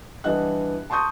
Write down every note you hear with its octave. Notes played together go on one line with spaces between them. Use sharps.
E3 G3 D4 D#5 F#5 F#6
A5 C6 C#6 D#6 G6